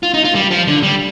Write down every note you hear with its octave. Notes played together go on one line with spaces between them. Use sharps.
F4
D#4
F4
G3
F3
D3
G3